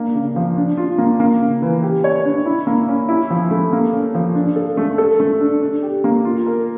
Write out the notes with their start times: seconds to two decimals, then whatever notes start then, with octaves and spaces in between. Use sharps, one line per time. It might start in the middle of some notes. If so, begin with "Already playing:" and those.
Already playing: A#3 D4
0.15 C#3
0.36 F3
0.57 D4
0.77 F4
0.98 A#3
1.20 A#3
1.41 C#3
1.62 E3
1.83 G4
2.04 C#5
2.25 D4
2.46 E4
2.67 A#3
2.89 C#4
3.09 E4
3.30 F3
3.51 A3
3.73 A#3
3.93 C#4
4.15 F3
4.35 D4
4.56 A4
4.77 A3
4.98 A4
5.20 A3
5.41 D4
5.62 D4
5.83 G4
6.04 A#3
6.25 F4
6.46 A#4